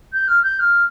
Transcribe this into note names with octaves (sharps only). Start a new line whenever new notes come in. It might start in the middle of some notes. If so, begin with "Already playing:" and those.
G6
F6
G6
F6